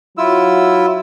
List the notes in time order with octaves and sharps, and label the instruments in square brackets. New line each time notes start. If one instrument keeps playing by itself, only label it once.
[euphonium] F#3 [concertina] E4 F4 E6